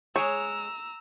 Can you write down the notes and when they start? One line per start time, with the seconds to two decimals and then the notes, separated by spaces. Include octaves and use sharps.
0.16 G#3 G#4 C#5 A#5 E6